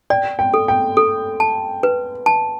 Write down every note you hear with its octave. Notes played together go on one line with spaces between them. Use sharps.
D5 G5
G5
A4
G5
A4
A5
B4
A5